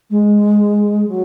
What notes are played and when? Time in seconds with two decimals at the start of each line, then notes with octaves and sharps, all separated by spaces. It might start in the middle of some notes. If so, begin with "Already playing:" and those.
0.10 G#3
1.07 F#3